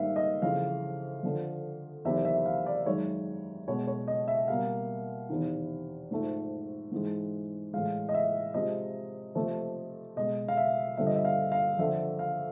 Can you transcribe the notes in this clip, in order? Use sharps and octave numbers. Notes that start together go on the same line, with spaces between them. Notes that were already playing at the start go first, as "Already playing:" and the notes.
Already playing: G#2 D#3 G3 A#3 E5 F5
D#5
F2 C#3 E3 F5
F2 D3 F3
E2 C3 D#3 F#3 A#3 E5
E5
F5
D5
F#2 D#3 G#3 C#5
B2 G#3 C#5
C#5
D#5
E5
B2 G3 A#3 F5
E2 C3 D#3
G#2 F3 A3
G#2 E3 G#3
A2 E3 G#3 F5
D#5
E5
C3 F3 G#3 D#5
F2 C3 F3 A3
B2 G#3 D#5
F5
E5
G2 D3 F3 E5
D#5
E5
F5
F5
F2 D3 F3 E5
F5